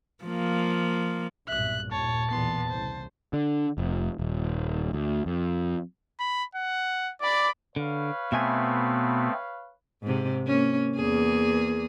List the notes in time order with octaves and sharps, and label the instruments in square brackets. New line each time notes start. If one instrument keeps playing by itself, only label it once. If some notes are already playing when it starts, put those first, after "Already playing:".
[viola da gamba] F3 A#3
[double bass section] B1 G2 A#2 [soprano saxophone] E5 [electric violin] F#6
[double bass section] D#2 A#2 [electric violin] C#5 [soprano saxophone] A5
[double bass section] B1 E2 A#2 [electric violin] B3 C6
[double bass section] C2 C#3 [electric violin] C5
[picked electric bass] D3
F1
D#1
D2
F2
[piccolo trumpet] B5
F#5
[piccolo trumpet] D5 [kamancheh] B5 D6
[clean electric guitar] D3 [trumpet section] B4 C#5 F5
[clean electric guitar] B2 E5 G#5 [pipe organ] A3 B3 C4
[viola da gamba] G#2 C3
A#3 C#4
E2 A#3 G#4